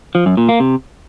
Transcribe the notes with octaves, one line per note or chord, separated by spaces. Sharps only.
F3
F#2
A#2
A#3
C3